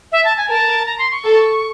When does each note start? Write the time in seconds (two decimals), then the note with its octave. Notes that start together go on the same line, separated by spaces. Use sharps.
0.12 E5
0.25 A5
0.37 G#5
0.49 A#4 A5
0.86 A#5
0.99 C6
1.11 C#6
1.24 A4